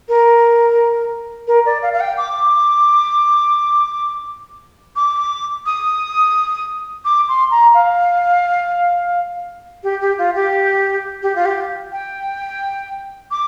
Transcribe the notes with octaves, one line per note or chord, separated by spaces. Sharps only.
A#4
A#4
D5
F5
F5
G5
D6
D6
D#6
D6
C6
A#5
F5
G4
G4
F4
G4
G4
F4
G4
G5
D6